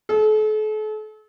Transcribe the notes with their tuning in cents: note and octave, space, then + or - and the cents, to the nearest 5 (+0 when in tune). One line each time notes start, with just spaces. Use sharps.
A4 -40